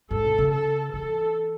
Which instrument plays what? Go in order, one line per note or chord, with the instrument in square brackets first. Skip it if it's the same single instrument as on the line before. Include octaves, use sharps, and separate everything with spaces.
[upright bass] G#2 [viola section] A4
[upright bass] B2
C#3
[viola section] A4
[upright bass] E3 [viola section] A4